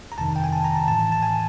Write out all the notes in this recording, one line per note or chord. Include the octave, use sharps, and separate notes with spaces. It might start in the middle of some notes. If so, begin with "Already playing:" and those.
A#5
F2 C3 D#3 A5
G5
G#5
A5
A#5
A5
A2 E3 A5
A5
G#5